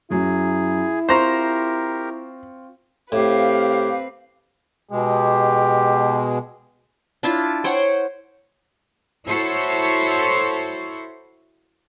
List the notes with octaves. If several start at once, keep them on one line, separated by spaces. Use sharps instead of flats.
F#2 F#3 E4 G#4
C4 F4 G4 A#4 C5 A#5 C#6
A2 C4 G4 B4 F5
B2 G#3 G4
D4 E4 F4 A5
C5 C#5 F#5 G5
E4 F#4 A4 C5 C#5